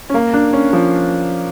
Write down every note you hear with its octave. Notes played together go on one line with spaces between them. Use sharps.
C#4
A#3
D4
C#4
F3